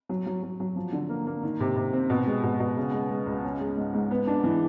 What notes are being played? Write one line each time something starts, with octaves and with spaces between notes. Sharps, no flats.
F#3
F#3
F#3
F#3
F3
D3
A#3
A#3
D#3
C3
C3
C4
B2
G#3
B2
B2
C#3
G#3
G#3
C#2
C#4
G#3
G#2
G#2
B3
D4
E3